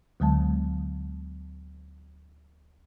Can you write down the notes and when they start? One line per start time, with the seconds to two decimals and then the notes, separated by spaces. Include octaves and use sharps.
0.20 D2 D3 F#3 G#3 A5